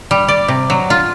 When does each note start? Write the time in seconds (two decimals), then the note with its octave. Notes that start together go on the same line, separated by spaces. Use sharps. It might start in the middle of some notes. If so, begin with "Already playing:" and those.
0.11 G3
0.28 D5
0.48 C3
0.70 F#3
0.90 F4